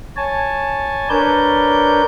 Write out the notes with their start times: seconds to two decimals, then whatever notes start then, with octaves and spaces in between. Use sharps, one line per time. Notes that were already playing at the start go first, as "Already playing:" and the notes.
0.17 C#5 G#5 A5
1.10 D4 A#4 B4 C#5 D5 G6